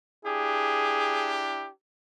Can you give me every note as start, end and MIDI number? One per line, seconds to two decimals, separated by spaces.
0.25 1.68 62
0.25 1.68 64
0.25 1.68 67
0.25 1.45 68